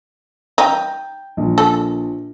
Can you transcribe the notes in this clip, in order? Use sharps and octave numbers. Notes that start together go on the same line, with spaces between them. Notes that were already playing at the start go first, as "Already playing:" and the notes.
D#4 G5
A#1
A4